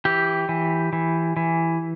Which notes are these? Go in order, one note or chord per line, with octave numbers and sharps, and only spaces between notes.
E3 G4
E3
E3
E3